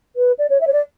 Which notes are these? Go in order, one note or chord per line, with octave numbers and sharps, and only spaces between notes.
B4
D5
C#5
E5
C#5
D5